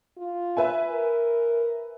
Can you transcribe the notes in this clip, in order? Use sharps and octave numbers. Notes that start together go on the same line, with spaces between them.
F4
B4 E5 G#5
A#4